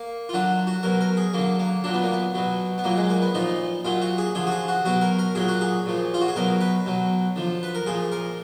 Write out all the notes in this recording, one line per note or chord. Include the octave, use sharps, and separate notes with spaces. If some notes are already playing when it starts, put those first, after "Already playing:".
Already playing: A#3
F4
D3 F#3 F#4
F#4
B2 F#3 A#4
A#4
G#4
D3 F#3 A#3
A#3
A#2 F#3 D4
B3
A#3
B3
B2 F#3
B3
A#2 F#3 A#3
G#3
A#3
B3
A#2 F3 D#4
A#2 F#3 F4
F#4
G#4
D3 F3 G#4
F#4
G#4
F#4
B2 F#3 F#4
A#4
A#4
A#2 F#3 G#4
F#4
G#4
A#2 F3
F4
F#4
G#4
B2 F#3 A#4
B4
B2 F#3
D3 F3
B4
A#4
A#2 F3 G#4
A#4